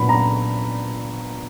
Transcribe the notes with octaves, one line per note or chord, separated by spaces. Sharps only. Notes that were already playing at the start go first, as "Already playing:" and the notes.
Already playing: A#2 F#3 B3 D4 B5
A#5